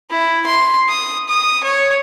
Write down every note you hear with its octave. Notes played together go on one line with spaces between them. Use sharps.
E4
C6
D#6
D#6
C#5